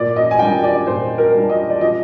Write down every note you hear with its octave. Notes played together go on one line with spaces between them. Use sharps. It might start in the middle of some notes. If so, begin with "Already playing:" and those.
Already playing: A#2 D5
D#5
G#5
G3 D4 G5
D5
A#2 C5
A#4
G3 D4
D#5
D5
F3 D#5